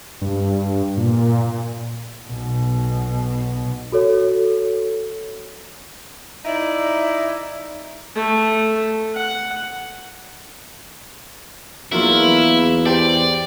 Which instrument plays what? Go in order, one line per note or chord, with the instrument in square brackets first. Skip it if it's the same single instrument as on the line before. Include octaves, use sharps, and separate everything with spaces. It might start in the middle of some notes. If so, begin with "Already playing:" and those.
[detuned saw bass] G2
A#2
[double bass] B1 B2
[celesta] F#4 A4 C#5
[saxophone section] D#4 E4 D5
[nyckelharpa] A3
F#5
[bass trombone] E2 [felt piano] F#3 A#3 F4 [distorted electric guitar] E4
[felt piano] G4 C5 G5 [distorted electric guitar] D5